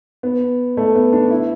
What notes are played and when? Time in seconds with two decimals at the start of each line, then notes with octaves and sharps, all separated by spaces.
0.23 B3
0.77 A3
0.95 B3
1.13 D4
1.31 E4